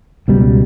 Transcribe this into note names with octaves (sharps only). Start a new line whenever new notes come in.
C#2 B2 G3